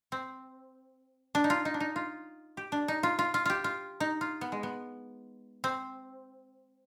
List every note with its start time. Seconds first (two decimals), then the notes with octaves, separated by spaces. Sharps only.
0.12 C4
1.35 D4
1.44 D#4
1.50 F4
1.65 D#4
1.74 D4
1.80 D#4
1.96 F4
2.57 G4
2.72 D4
2.88 D#4
3.03 F4
3.19 F4
3.34 F4
3.45 F4 G4
3.64 F4
4.00 D#4
4.21 F4
4.41 B3
4.52 G#3
4.63 B3
5.64 C4